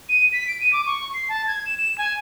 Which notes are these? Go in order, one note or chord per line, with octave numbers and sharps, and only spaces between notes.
D#7
B6
D7
D#7
D6
C#6
C7
A5
G#6
E7
E7
G#5